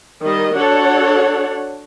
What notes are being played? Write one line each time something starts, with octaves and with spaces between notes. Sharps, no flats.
D#3 G3 D#5
D4 F#4 A4 C#5 F#5